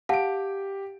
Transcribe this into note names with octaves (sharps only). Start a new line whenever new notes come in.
G4 F5 F#5 A5 D7